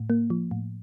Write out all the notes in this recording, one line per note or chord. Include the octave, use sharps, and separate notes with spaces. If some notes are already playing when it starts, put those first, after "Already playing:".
Already playing: A2
A#3
F3
A2